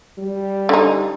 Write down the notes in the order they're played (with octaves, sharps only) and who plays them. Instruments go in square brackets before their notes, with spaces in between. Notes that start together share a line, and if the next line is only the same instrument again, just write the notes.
[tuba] G3
[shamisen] D3 D#4